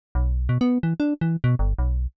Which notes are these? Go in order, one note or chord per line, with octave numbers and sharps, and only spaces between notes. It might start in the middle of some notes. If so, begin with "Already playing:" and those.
B1
B2
B3
E3
D4
E3
B2
G1
B1